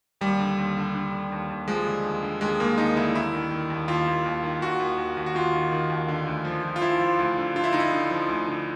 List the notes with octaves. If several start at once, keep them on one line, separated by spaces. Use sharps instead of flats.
D#2 G3
D3
D#2
D3
D3
D3
D#2
D#2
F3 G#3
D3
D#2
D3
D#2 G#3
D#2 A#3
D#2 D#4
D3 E4
D#2 E4
D#3
D#3
D#2
D#2 F4
D#2
D#2
D#3
D#2 F#4
D#2
D#2
D#2
F#4
D#2 F4
D#3
D#3
D#2
D3
D2
F3
F3
F4
F3 E4
F3
D2
D3
D3 F4
E4
D3 D#4
E4
D3
F3
D2
D3